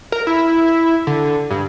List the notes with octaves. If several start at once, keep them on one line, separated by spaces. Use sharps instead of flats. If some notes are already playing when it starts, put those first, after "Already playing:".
A#4
E4
D3
G2